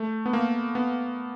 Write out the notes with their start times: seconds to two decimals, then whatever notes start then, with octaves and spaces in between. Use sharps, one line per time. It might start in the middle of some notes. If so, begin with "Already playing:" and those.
Already playing: A3
0.26 B3
0.33 A#3
0.75 B3